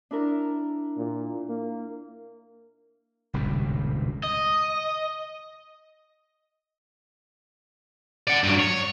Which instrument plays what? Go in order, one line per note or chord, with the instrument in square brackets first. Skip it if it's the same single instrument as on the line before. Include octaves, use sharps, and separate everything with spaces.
[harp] D4 E4 A#4
[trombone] A#2
A#3
[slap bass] D#1 C#2 G2 B2
[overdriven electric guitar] D#5
[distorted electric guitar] D5 F#5
G2 F#3
C#5